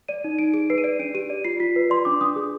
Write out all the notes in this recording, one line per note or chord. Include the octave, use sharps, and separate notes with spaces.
D5 D#7
D#4
D#4 D7
G#4 D7
B4 C7
D#7
D5 D7
D4 D7
G4 D#7
D5
F4 C7
F4 B6
B4
D5 C6
D4 D6
D4 D#6
G#4